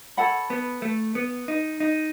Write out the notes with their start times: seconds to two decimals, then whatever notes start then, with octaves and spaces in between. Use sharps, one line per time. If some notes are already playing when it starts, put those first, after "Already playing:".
0.17 A4 C#5 F#5 B5
0.50 B3
0.82 A3
1.15 B3
1.48 D#4
1.80 D#4